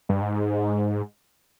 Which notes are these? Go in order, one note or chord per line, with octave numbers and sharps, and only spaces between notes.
G2
G#2